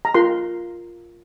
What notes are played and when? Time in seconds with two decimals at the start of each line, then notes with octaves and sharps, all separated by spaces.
0.05 A#5
0.14 F4 A#4 C6